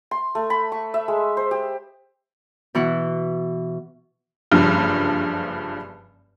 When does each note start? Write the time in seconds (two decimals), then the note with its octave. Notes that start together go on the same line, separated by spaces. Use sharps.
0.11 C6
0.35 A3
0.50 B5
0.72 C#6
0.94 E5
1.08 G#3
1.37 C5
1.51 G4
2.75 B2 E3 F#5
4.51 F#1 G2 F3